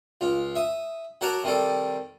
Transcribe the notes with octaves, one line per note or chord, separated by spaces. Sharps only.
C#2 F4
E5 D#6
F#3 F#4 A#4 F#5 A5 D6
C3 D#3 G3 A4